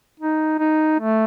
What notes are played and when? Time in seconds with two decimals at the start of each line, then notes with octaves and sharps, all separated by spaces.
0.20 D#4
0.59 D#4
1.00 A3